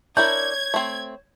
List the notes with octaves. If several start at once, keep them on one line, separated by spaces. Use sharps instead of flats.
D4 E4 A#4 C#5 G6 G#6
A3 C4